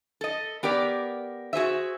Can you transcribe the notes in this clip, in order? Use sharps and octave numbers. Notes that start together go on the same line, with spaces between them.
A4 D#5
B3 G4 A#4 D5
F#4 G#4 C5 E5